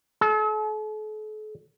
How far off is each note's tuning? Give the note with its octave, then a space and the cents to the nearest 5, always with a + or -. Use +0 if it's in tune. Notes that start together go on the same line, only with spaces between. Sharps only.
A4 -45